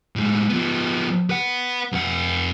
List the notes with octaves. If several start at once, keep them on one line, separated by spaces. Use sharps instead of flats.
A2 G#3
F3 B3
B4 F#5
F2 F#5